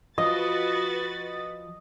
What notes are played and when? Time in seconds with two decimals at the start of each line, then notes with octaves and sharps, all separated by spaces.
0.18 F3 F4 F#4 B4 D#5 A6